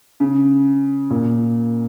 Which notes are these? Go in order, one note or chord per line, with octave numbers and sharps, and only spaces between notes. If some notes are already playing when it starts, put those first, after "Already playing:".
C#3
A#2